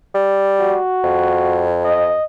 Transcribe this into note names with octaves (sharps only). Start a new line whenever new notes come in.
G3
F#4
F2
D#5